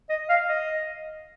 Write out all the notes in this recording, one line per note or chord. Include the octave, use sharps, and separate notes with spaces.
D#5
F5
D#5